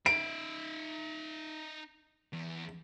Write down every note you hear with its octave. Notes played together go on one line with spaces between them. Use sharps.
D#4 E5 D7
E2